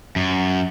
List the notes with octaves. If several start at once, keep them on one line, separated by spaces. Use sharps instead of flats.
F#2